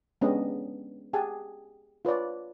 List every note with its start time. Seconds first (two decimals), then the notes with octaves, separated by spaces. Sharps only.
0.21 G#3 B3 C#4 D4 G4 D#5
1.13 G4 G#4 F#5 G#5 A5
2.05 F4 B4 C#5 D5